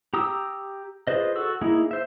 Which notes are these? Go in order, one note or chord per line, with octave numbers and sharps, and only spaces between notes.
G4 A#5 D#6 E6
F4 G#4 B4 C5 D#5
F#4 A4 E6
A#3 D#4 E4 G#4
C5 E5